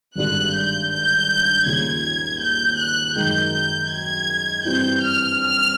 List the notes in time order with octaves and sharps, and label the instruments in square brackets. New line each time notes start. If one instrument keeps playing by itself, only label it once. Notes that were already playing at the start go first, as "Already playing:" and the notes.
[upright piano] G#1 G2 D3 G3 [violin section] F#6
[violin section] G6
G6
[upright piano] D#2 C#3 F3 [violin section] G#6
[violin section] G6
F#6
[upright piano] F#2 D#3 G#3 [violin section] G6
[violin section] G6
G#6
[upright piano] G2 E3 G3 C4 [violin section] G6
[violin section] F6
F6